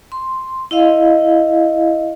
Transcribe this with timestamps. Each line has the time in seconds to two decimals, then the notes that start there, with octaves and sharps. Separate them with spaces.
0.12 C6
0.71 E4 D#5 F5